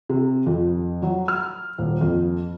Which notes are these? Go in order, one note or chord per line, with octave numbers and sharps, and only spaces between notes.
C3
F2
F#3
F6
D#1
F2